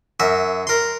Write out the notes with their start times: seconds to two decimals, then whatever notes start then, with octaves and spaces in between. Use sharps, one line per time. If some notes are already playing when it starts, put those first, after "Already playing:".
0.20 F#2 E5
0.67 A#4 C6